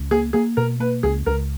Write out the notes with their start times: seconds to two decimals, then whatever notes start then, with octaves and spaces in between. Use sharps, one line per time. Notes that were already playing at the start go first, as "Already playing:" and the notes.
Already playing: C#2
0.11 A#3 G#4
0.33 A#3 G#4
0.57 B2 A#4
0.80 A#3 B4
1.03 C#2 G#4
1.26 C#2 A#4